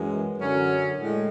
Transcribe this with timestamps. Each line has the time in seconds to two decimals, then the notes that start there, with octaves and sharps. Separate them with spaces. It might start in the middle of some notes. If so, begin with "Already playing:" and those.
Already playing: F#2 E3 G#3
0.39 F#2 D3 F#3 C#4
1.00 A2 G#3